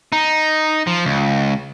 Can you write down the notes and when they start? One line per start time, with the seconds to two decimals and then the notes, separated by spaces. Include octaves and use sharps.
0.12 D#4
0.87 F3
1.05 C#2